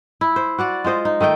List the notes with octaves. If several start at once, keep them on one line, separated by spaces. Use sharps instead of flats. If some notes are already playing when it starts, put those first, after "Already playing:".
E4
C5
F#4 D5 F#5
G#3 F4 C5 D#5
D#4
D#3 A3 D#5 G5